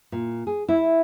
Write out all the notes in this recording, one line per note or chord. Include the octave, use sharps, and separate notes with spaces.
A#2
G#4
E4